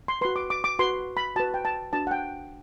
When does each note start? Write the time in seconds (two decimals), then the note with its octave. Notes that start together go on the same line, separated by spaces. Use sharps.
0.08 C6
0.21 F#4 B4 C6
0.36 D6
0.50 D6
0.64 D6
0.79 F#4 B4 C6
1.17 B5
1.36 F#4 B4 A5
1.54 G5
1.65 A5
1.93 D4 F#4 B4 A5
2.07 F#5
2.11 G5